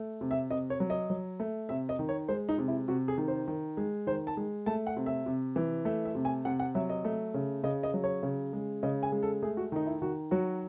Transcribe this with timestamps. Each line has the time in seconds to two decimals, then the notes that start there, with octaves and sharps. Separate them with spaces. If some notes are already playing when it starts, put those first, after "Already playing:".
Already playing: A3
0.21 C3
0.31 E5
0.50 C3 D#5
0.70 C#5
0.80 F#3
0.90 D#5
1.10 F#3
1.40 A3
1.69 C3 E5
1.89 D#5
1.99 D#3
2.09 C#5
2.28 G#3 C5
2.49 D#4
2.58 C3
2.68 E4
2.88 C3 F#4
3.08 G#4
3.18 D#3
3.28 C5
3.48 D#3
3.77 G#3
4.07 D#3 C5
4.27 A5
4.37 G#3
4.66 A3 A5
4.87 F#5
4.97 C3
5.06 E5
5.26 C3
5.56 E3
5.85 A3 E5
6.05 E5
6.15 C3
6.25 G#5
6.45 C3 F#5
6.60 F#5
6.75 F#3 E5
6.90 D#5
7.05 A3
7.34 C#3
7.63 C#3 D#5
7.83 D#5
7.94 F#3
8.04 C#5
8.23 C#3
8.53 G#3
8.83 C#3 D#5
9.03 G#5
9.12 G#3
9.23 A4
9.42 A3 G#4
9.57 F#4
9.72 D#3 D#4
9.87 E4
10.02 D#3 F#4
10.31 F#3 F#4